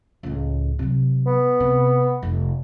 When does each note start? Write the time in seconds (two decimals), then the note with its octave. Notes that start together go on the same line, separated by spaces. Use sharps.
0.23 C#2 A2
0.79 C3 F#3
1.27 B3
1.60 C3
2.23 F1 D#3